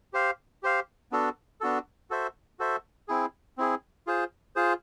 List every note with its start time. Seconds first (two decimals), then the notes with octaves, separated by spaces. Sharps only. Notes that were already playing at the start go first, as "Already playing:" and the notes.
0.13 G4 C5 F5
0.63 G4 C5 F5
1.12 B3 D4 F#4 A4
1.61 B3 D4 F#4 A4
2.10 F#4 A4 C5 E5
2.59 F#4 A4 C5 E5
3.08 C4 E4 G#4
3.58 C4 E4 G#4
4.07 F4 G#4 C5
4.56 F4 G#4 C5